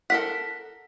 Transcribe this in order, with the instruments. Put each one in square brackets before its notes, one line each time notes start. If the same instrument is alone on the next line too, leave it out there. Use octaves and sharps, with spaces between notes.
[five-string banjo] A4 A#4 F#5 [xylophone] B6